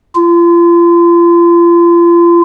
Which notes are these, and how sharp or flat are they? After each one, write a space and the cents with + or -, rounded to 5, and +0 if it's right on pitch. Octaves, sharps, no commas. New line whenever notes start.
F4 -35